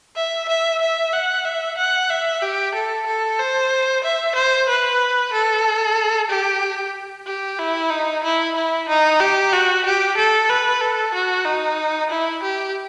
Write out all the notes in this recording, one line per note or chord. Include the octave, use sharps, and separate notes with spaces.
E5
E5
E5
F#5
E5
F#5
E5
G4
A4
A4
C5
E5
C5
B4
A4
G4
G4
E4
D#4
E4
E4
D#4
G4
F#4
G4
A4
B4
A4
F#4
D#4
E4
G4